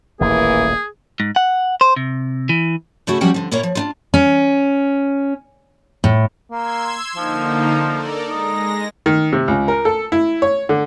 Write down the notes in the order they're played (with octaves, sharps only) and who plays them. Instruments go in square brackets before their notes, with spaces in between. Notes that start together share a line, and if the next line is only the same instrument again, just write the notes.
[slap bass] D#1 A1 [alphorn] E3 [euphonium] A#3 [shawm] G#4
[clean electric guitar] G#2
F#5
C5
C3
E3
[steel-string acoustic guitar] C#3 A3 E4 F#4
F3 G3 C#4 F#4 F#5 G5
D3 F3
D#2 A#2 A#3 E4 C#5
F3
D4 D#4 F4
C#4
A2
[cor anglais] A#3 [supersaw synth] C6 E6 G#6
[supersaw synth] D3 A#3 D#4 [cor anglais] F3
[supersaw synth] A4 A#4 D5
[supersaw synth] G#3 A#6 [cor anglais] D#4
[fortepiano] D#3
C3
C#2
A#4
A4
E4
C#5
D3